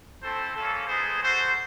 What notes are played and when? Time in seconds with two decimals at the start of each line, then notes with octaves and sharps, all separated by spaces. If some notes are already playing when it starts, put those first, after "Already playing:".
0.22 A3 C4 E4 A4 C5
0.56 A#3 C#4 F4 A4
0.87 G#3 B3 D#4 G#4 C5
1.20 F#4 A4 C5